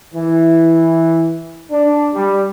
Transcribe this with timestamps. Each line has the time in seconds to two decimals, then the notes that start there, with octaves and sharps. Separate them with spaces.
0.14 E3
1.70 D4
2.13 G3